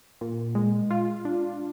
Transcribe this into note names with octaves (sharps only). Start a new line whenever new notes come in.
A#2
G#3
F4
D4